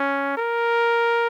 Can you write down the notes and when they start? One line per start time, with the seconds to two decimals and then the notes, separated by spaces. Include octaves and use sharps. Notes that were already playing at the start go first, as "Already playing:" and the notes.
Already playing: C#4
0.37 A#4